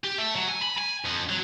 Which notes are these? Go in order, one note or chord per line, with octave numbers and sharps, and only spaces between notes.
G4
A3
F#3
G#5
B5
G#5
F2
F#3